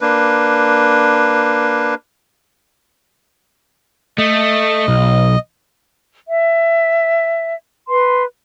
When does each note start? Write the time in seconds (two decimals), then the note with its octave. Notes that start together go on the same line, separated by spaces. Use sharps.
0.01 A#3 D4 B4
4.18 A3 D#5
4.88 B1
6.28 E5
7.88 B4 C6